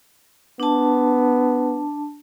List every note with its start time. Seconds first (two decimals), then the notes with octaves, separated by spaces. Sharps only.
0.60 B3 D4 A5